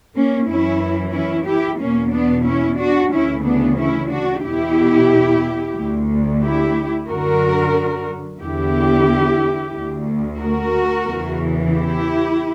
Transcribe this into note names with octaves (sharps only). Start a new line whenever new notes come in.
A#3 C#4
F#2 E3 C#4 E4
C#4 E4
E4 G4
E2 B2 A#3 C#4
B3 D4
C#4 E4
D4 F#4
D2 C#3 E3 C#4 E4
B3 D4
C#4 E4
D4 F#4
E2 B2 E4 G4
D2 D3
E4 G4
F#2 D3 F#4 A#4
E2 D3 E4 G4
D2 D3
F#4 A#4
E2 C#3 E3
E4 G4